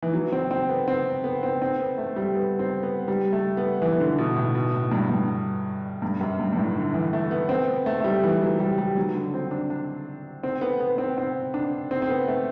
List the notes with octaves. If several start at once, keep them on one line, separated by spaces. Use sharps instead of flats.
E3
F#3
C4
C4
B3
C4
B3
C4
C4
B3
A3
G3
B3
C4
B3
G3
A3
B3
E3
E3
D3
B2
A2
B2
A2
G2
G2
G2
F#2
G2
G2
A2
D3
E3
A3
B3
C4
B3
A3
A3
G3
E3
F#3
G3
G3
F#3
D3
C4
D4
D4
C4
B3
B3
C4
C4
D4
C4
C4
B3
A3